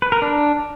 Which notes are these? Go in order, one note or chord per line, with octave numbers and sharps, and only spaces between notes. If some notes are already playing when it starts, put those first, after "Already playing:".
B4
A#4
D4